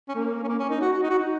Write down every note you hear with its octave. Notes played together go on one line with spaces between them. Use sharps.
C#4
A#3
C#4
A#3
C#4
D#4
F#4
F#4
D#4
F#4
D#4